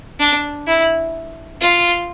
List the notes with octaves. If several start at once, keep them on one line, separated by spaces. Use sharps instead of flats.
D4
E4
F4